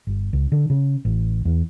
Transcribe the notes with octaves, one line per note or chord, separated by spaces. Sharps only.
G1
C#2
D3
C#3
A1
E2